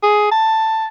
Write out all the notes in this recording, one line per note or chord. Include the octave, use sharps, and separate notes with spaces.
G#4
A5